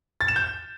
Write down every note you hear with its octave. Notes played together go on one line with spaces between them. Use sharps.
A6
E7
G6